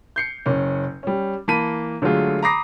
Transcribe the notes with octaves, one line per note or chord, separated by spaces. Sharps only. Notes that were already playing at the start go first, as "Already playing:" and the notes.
G6 C7 C#7
F#1 C#4
G3 C#4
E3 A#3 A5 B5 B6 D#7
D3 F#3 G#3 A3 F4 G#4
A#5 B5 D6 D#6 A#6 C7